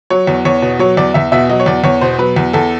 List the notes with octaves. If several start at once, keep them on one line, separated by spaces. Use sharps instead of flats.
F#3 C#5
E2
E2 C#5
B2
F#3 C#5
E2 D5
E2 E5
B2 E5
F#3 D#5
C#5
E2 D5
E2 C#5
B2 C5
F#3 B4
E2
E2 A4